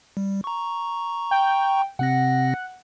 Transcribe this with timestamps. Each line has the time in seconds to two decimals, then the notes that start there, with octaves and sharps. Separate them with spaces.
0.17 G3
0.44 A#5 C#6
1.31 G5
1.99 C3 C4 F#5 A#6